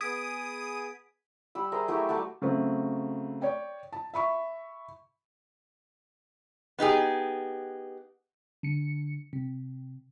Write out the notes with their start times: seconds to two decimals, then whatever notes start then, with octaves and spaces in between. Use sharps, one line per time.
0.01 B3 G#4 D#6 G#6 B6 D7
1.55 G3 B5 E6
1.72 G#4 A#4 C5 E5
1.88 F#3 A3 E4 G4
2.09 G3 A3 F#4 A5
2.42 C#3 F#3 A3 C4
3.42 C#5 D5 G5
3.93 A5
4.14 E5 B5 C#6
6.79 B3 D#4 G4 G#4
8.63 D3 C#7
9.33 C3